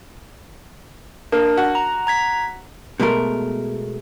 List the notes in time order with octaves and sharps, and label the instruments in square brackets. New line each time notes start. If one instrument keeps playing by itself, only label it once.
[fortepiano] A#3 [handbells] D4 A#4
[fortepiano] F#4
[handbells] A#5
A#5 G#6 B6
[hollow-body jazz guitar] B2 G#3 A3 A#4